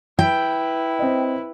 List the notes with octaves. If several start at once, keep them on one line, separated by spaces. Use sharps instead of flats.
E4 B4 G5
C4 D#5